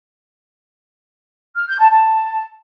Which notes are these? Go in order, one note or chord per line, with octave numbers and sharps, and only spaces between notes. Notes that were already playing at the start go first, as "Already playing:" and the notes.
F6
G6
A5
A5